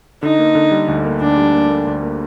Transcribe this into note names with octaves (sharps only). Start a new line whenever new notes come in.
D3 D#4
A#3
D3
G3
D2
A#3
D2 D4
G3
A#3
A#3
D2
A#3